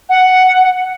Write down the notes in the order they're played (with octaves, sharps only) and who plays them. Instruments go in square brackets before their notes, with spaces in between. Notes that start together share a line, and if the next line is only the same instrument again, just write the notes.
[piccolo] F#5